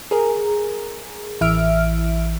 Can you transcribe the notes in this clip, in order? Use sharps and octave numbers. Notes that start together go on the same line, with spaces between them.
G#4 A#4
A1 E3 E5 F6 D7